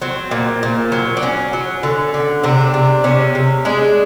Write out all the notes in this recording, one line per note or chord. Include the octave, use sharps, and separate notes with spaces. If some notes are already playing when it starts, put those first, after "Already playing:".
F#3 C4
A#2
A#2
F#3
D4
F#3 C#4
F#3
D3
D3
C3 D4
C3
C3 C#4
C3
G#3 D4